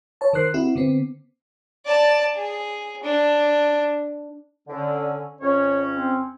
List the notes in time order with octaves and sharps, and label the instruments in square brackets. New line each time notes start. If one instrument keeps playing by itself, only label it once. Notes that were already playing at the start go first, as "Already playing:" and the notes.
[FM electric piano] C#5 A5
D#3 A#4 C5 F#6 C7
C4 E4 F#4
D3 B3 C4
[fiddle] D5 A5
G#4
D4
[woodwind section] D3 [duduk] C#4
[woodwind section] F2 C#3 C#4 [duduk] C#5
[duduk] C4